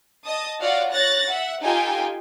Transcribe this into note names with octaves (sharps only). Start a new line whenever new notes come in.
D#5 A5 D#6
F4 F#4 C#5 D5 F5 F#5
C#5 F#6 A6 A#6
E5 F#5
D#4 F4 G4 A4 G5 G#5